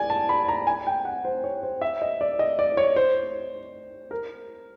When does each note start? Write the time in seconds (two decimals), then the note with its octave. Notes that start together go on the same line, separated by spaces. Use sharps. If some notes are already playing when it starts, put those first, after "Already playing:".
Already playing: D5 G#5
0.10 A5
0.29 B5
0.48 A#5
0.67 G#5
0.87 G5
1.05 F#5
1.25 C5
1.44 C#5
1.63 C5
1.82 E5
2.02 D#5
2.21 D5
2.39 D#5
2.59 D5
2.77 C#5
2.96 C5
4.11 A#4